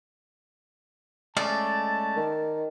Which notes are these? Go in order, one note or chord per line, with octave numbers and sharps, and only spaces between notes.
G#3 A3 C#4 D5 A5
D#3